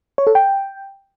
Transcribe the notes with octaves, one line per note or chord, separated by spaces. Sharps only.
C#5
A4
G5